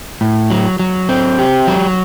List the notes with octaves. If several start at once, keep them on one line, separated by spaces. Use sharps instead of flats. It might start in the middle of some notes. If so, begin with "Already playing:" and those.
A2
F#3
F#3
C4
G4
F#3